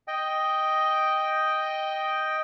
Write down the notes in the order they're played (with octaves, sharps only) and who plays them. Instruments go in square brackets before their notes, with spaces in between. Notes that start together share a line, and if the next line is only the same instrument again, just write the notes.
[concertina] D#5 G5